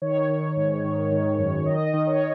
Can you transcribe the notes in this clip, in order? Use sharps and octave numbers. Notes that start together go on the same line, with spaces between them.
D#3 C#5
D#3
G#2
D#3
D#3
F#2
D#3 D#5
D#5
D#3
C#5